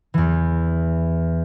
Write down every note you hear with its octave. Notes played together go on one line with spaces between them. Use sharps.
E2 E3